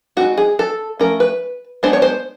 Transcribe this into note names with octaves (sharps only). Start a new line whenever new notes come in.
G#3 C4 D#4 F#4
G#4
A4
F3 A3 C#4 A#4
B4
G#3 B3 D4 C5
C#5
C5